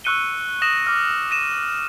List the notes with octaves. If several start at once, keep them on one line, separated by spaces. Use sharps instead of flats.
C#6 E6 F#6 C#7 D#7 G7
D#6 A#6 E7 F#7
D6 F6
A#6 D#7 E7